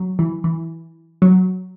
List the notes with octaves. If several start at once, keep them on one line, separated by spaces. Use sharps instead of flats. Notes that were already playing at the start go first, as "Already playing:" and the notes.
Already playing: F#3
E3
E3
F#3